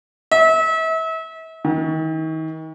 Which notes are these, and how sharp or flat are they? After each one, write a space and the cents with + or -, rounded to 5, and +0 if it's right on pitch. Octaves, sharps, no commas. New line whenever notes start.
E5 -35
D#3 +40